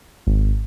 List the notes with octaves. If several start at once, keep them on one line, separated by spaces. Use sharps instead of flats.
G#1